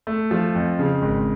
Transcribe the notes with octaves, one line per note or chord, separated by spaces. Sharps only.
A3
F3
F2
C#3
G#1